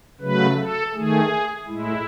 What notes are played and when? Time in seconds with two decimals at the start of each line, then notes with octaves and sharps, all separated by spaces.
0.21 C#3 F#3 A3 B4
0.58 A4
0.94 D#3 A3 G#4
1.66 A2 G#3 E4